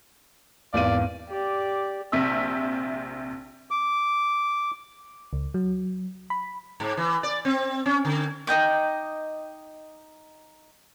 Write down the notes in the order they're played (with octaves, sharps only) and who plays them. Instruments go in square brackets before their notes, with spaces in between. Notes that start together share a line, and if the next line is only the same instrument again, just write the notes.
[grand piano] G#1 E2 D#7 [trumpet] D5 [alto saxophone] F5
[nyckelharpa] G4 D5
[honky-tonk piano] A#1 C3 E5 E6
[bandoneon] D6
[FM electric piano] C#2
F#3
B5
[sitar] G#2
E3
D5
C4
C#4
D3
[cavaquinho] D#4 D#5 G5 D6